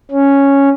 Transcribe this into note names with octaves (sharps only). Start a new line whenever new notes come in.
C#4